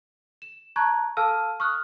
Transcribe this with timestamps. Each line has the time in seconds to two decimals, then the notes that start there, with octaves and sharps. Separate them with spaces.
0.42 E7
0.76 A5 A#5 C#6 F#6 G#6
1.17 A4 F5 A5 E6 F6 D#7
1.60 C#6 D#6 F6 F#6